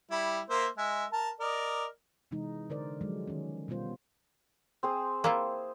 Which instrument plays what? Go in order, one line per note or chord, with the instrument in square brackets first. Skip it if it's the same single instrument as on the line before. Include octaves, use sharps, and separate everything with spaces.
[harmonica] G3 E4
A#3 C5 E5
G#3 E5
A#4 A5
A#4 D5 D#5
[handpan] C3 E3 G#3 D#4
D3 A#4 C5 D5
F3 F#3 G#3
D#3 C#4
B2 G3 B3 F4 C5
[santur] C4 G#4 C5
[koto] A#3 E4 F4